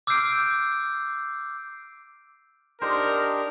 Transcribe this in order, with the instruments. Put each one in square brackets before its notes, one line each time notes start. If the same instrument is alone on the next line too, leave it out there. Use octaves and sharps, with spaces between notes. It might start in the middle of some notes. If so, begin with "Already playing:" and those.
[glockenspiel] D6 E6 F6 G6 C7 D7
[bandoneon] D4 D#4 G4 [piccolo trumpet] A#4 [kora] C5